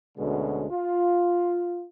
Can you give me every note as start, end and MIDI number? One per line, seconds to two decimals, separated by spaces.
0.18 0.65 38
0.18 0.65 47
0.18 0.65 50
0.18 0.65 56
0.18 0.65 61
0.69 1.85 65